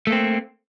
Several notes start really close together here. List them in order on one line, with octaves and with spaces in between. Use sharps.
A3 A#3 C4